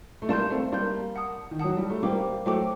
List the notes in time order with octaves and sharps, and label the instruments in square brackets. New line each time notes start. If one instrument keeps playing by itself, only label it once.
[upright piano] A3
[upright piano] G3 A#3 [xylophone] D5 A5 C6 G6
[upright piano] A3 C4
[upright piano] G3 A#3 [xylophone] D5 A5 C6 G6
[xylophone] F#5 A5 D#6
[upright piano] D#3
[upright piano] F#3 [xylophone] F#5 A5 D#6
[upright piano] G3
A3
[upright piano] G3 A#3 [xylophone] C5 G5 D6
[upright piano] F#3 A3 [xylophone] C5 G5 D6